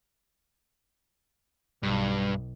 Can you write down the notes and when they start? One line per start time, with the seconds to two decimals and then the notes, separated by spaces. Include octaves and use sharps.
1.83 B1 G2